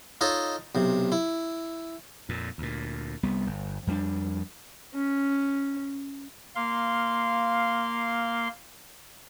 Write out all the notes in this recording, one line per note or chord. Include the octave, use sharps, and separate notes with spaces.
D#4 F4 A4 C#5 D#5
B1 C3
E4
F2 A#2
D2 A#2
C2 G3 B3
G1
F2 G3 C#4 D4
C#4
A#3 F5 C6